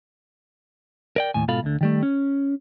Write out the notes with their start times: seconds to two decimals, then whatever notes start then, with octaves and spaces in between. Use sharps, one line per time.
1.16 A#4 D5 G5
1.34 D#2 A2 G#5
1.48 G#2 B2 F4 A4 F5 B5
1.63 D2 D3
1.81 D#3 G3 A3
2.03 C#4